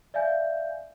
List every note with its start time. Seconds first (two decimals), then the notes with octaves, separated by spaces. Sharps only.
0.14 D5 E5 F5 G#5 G6